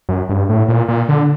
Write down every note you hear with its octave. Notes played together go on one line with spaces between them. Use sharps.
F#2
G2
A2
A#2
A#2
D3